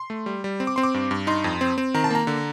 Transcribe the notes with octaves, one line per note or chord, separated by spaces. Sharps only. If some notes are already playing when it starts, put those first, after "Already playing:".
Already playing: C6
A3
G3
G3
C4
D6
C4 C6
D6
G2
G2
D#4 C6
F2
C4
C4
D#3 A#5
A5
A#3 A#5
D3